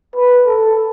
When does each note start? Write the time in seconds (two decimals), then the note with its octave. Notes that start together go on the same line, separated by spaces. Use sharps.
0.16 B4
0.47 A4